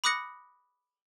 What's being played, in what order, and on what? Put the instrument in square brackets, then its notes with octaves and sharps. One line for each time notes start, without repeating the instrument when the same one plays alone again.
[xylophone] B5 D6 D#6 F#6 A#6 C#7